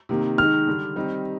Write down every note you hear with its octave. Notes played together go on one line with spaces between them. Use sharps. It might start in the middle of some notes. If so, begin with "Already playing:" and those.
C3 D#3 A#3
D#3 G#3 D#4 F6
D3 G3 D4
D#3 G3 C4 D#4